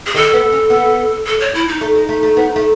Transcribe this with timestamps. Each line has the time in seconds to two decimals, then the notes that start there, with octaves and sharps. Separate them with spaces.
0.06 G#4
0.14 D#3 A4
0.33 B3
0.52 C#4
0.70 B3
1.26 A4
1.40 C#5
1.54 E4
1.68 D#4
1.81 A3
1.95 G#3
2.09 A3
2.23 A3
2.37 B3
2.56 A3